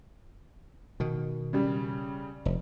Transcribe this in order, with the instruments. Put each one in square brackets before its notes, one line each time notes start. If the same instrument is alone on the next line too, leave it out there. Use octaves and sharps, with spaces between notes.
[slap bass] B2 D#3
[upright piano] C#3 G3
[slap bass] F1